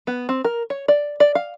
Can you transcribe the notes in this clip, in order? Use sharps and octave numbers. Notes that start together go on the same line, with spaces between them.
B3
C4
A#4
C#5
D5
D5
F5